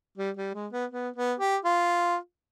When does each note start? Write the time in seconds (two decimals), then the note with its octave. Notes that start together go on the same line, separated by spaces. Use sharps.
0.18 G3
0.37 G3
0.55 G#3
0.72 B3
0.92 B3
1.16 B3
1.40 G4
1.65 F4